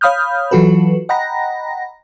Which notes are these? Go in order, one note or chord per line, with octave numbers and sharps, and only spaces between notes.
C#5 F5 B5 D#6 F6 G6
E3 F#3 F4 F#4 A4 B4
D#5 F#5 G5 A#5 B5 A#6